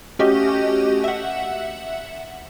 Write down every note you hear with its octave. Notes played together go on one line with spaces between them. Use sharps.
A3 C#4 F#4 G4 D#5
E5 F#5